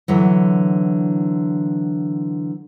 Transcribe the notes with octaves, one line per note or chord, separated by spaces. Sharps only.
D3 E3 F#3